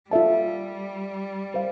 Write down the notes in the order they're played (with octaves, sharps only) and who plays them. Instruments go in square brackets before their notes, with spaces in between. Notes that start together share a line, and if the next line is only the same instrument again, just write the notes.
[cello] G3 [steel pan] F4 A4 E5 A5
[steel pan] C5 F5